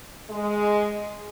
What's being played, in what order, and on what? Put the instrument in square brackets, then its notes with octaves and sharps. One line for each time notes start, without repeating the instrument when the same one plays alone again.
[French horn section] G#3